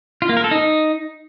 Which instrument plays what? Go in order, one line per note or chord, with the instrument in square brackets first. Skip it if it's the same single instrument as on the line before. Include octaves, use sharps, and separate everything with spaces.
[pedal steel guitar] F4
A#3
A#4
A4
D#4